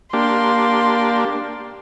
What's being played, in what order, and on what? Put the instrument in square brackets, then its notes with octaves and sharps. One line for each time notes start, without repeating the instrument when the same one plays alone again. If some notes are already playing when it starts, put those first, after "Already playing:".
[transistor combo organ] A#3 D4 G4 [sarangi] C6